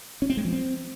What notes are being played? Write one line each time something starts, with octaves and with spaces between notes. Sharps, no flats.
C#4
C4
G#3
F3
C4